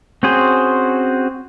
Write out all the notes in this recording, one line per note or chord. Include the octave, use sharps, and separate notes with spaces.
C4 C#4 F#4 G#4 C5